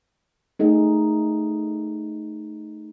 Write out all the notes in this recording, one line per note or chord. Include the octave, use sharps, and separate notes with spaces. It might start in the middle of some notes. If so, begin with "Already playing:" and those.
A3 D#4 G#4